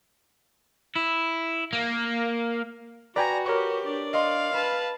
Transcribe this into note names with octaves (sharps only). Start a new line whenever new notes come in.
E4
A#3
F#4 B4 D5 G5 G#5 A#5 A#6
G4 A#4 C#5 C#6
D4 D5
D#5 F5 C6
B4 A5 B5